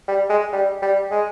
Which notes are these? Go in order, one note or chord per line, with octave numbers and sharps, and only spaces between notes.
G3
G#3
G3
G3
G#3